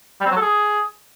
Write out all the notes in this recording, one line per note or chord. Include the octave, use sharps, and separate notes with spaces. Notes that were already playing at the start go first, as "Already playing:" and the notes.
G3
C4
F#3
A4
G#4